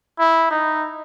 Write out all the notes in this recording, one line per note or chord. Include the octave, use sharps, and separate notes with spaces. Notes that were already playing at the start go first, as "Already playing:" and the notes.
E4
D#4